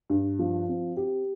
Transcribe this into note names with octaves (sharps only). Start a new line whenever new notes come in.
G2
F3
C4
G4